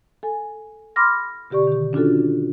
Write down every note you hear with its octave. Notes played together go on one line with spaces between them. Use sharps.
A4 G#5
B5 C6 D6 F6 A#6
B2 D3 G4 D5 C#6
D#3 G4
C#4 D4 F4 F#4 A4